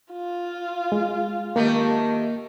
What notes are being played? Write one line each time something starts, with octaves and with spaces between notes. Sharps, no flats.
F4
G#3
D#3 A3 A#3 G4